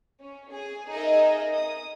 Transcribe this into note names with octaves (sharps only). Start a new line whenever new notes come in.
C#4
G#4
D#4 G#4 A#4 D#5 E5
D#6